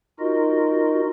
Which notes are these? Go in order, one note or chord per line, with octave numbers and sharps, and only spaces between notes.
D#4 F4 F#4 A#4 D#5